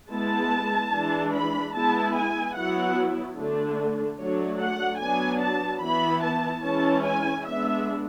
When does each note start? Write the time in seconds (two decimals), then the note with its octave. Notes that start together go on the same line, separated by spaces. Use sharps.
0.11 G#3 B3 E4 A5
0.93 E3 G#3 D4
1.33 B5
1.74 G#3 B3 E4 A5
2.15 G#5
2.56 F#3 B3 E4 F#5
3.38 D3 A3 D4
4.19 F#3 A3 D4 C#5
4.60 F#5
5.00 F#3 B3 D4 G#5
5.42 A5
5.82 E3 B3 E4 B5
6.23 A5
6.64 E3 G#3 C#4 E4 A5
7.05 G#5
7.46 G#3 B3 D4 E5